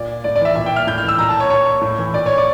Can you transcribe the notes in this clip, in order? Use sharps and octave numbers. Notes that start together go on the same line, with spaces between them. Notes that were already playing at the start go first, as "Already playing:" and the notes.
Already playing: A#2 D5
A2 D5
D5
E3 E5
A#2 E5
G5
F6
A2 G6
F6
E3 E6
A#2 A#5
A5
C#5
A#2 C#5
A2
E3
A#2 D5
C#5
D5